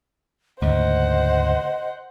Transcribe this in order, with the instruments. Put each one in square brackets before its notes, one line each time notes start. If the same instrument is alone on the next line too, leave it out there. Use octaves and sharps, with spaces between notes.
[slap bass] D2 G#2 C#3 [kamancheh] C5 F#5 [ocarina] D#5